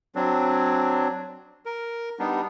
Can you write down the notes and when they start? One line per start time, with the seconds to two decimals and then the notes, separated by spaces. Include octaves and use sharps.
0.15 F#3 C4 D4
1.66 A#4
2.19 G3 B3 D4 D#4